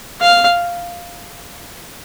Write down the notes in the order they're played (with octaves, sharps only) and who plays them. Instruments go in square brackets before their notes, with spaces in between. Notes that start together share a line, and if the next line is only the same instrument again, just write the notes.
[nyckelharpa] F5